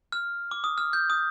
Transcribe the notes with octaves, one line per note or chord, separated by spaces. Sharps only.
F6
D6
D#6
F6
G6
D#6